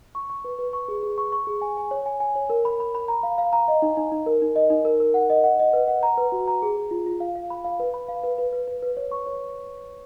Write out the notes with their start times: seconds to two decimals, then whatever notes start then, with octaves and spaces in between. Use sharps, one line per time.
0.15 C#6
0.30 C#6
0.44 B4
0.59 B4
0.73 C#6
0.88 G#4
1.03 G#4
1.18 C#6
1.32 C#6
1.47 G#4
1.61 G#5
1.77 G#5
1.91 C#5
2.06 G#5
2.20 G#5
2.35 C#5
2.50 A#4
2.65 B5
2.80 B5
2.95 B5
3.08 A#5
3.23 F5
3.38 F5
3.53 A#5
3.68 D#5
3.82 D#4
3.97 D#4
4.12 D#4
4.26 A#4
4.42 D#4
4.56 D#5
4.70 D#4
4.85 A#4
5.00 A#4
5.14 F#5
5.30 D#5
5.44 F#5
5.59 D#5
5.73 B4
5.88 F#5
6.03 A#5
6.18 B4
6.32 F#4
6.48 A#5
6.62 G#4
6.77 G#4
6.91 F4
7.06 F4
7.20 F5
7.35 F5
7.50 B5
7.64 F5
7.80 B4
7.94 B5
8.09 F5
8.23 B4
8.38 B4
8.53 B4
8.68 B4
8.82 B4
8.97 C#5
9.12 C#6
9.26 C#5